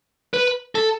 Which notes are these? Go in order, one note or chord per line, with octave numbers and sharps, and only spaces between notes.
B4
A4